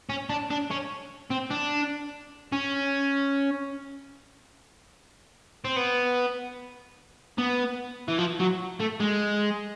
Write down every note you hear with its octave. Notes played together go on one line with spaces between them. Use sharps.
C#4
D4
D4
C#4
C4
D4
C#4
C4
B3
B3
E3
F3
F#3
A3
G#3